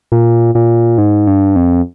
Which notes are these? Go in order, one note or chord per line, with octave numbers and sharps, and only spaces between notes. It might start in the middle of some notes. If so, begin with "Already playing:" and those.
A#2
A#2
G#2
G2
F2